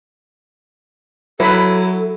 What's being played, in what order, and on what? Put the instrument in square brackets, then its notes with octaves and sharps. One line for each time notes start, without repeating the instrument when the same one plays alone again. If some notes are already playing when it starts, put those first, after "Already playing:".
[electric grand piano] F#3 [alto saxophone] E4 [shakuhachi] A4 [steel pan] B4 B5